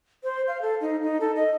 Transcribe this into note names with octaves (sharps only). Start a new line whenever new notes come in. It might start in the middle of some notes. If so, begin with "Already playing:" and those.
C5
F5
A4
D#4
D#4
A4
D#5